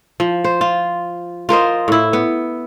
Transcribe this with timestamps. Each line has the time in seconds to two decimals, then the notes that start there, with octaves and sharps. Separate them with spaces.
0.20 F3
0.44 C5
0.61 F4
1.49 F4 A#4 C5 D#5
1.88 A2 E4
2.13 B3